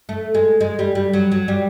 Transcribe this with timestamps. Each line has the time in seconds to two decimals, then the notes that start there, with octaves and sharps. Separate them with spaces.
0.09 A3
0.34 G#3
0.61 G#3
0.79 G3
0.95 G3
1.14 F#3
1.32 F#3
1.48 G3